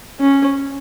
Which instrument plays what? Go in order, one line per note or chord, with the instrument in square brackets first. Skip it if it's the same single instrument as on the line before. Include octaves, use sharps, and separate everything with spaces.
[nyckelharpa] C#4